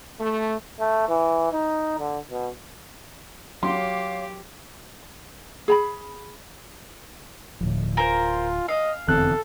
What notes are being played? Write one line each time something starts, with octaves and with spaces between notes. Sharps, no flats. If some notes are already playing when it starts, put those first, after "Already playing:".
A3
A3
E3
D#4
D3
B2
F#3 G4 C#5 F5 C6 D6
G#4 A#5 B5
D1 A2 D3 F3
F4 A#4 C5 G#5
D#5 F5
F1 E2 D3 C4 A4 F#6